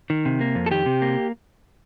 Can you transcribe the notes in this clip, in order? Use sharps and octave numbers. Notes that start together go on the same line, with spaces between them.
D#3
C3
A#3
F2
A4
D#3 G4
C3
A#3